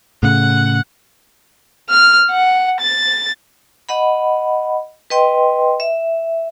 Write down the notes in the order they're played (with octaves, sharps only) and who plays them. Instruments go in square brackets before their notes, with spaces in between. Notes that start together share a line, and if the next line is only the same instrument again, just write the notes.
[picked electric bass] A2 C#3 [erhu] F#5
[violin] F6
F#5
A6
[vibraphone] D#5 F#5 B5
B4 D#5 G5 C6
E5